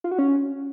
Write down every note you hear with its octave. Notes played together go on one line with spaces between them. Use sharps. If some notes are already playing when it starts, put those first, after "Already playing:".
F4
F#4
C#4